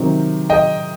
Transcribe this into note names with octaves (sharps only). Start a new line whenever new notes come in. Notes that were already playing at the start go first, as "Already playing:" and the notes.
Already playing: C3 D#3 F#3 C4
D#5 G5